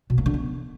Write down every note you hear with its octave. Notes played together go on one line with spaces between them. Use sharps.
B2
A#3
D3
B3